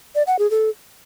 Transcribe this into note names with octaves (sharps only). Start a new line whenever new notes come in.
D5
F#5
G#4
A4